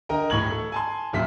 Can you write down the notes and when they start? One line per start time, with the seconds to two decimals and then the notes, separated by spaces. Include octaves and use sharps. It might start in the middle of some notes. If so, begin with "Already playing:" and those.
0.09 D3 A#4 D#5 G5 A#5
0.30 D1 A2 C#6 G#6 F#7
0.50 A4
0.72 G#5 A5 C6
1.13 D1 F#2 A#2 E5 B6